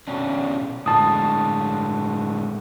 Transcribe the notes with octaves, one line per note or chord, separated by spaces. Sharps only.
B2 C#4 D4
A2 D3 G#3 A5 D#6